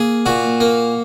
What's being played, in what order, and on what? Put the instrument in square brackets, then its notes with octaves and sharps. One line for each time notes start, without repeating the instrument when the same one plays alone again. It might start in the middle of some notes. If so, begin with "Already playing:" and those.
Already playing: [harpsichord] A#3 G#4
A#2 F#4
A#3